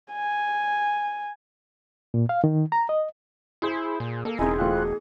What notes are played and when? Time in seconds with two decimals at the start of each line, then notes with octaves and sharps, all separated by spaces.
0.13 G#5
2.14 A#2
2.29 F5
2.44 D#3
2.72 A#5
2.89 D#5
3.62 E4 G#4 C5
4.00 A#2
4.25 A#3 A4
4.39 E1 C4 D#4 E4 G#4 A#4 D#5 G#5
4.58 B2 E3 A3 C4 F4 F#6